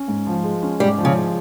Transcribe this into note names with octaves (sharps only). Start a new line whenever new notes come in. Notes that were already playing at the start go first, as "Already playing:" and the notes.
Already playing: C#4
G#2
F3
G#3
C#4
G#2 G3
F3
C#3
G#3